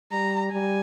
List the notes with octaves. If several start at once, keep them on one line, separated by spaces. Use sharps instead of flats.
G3 A#5
G3 G#5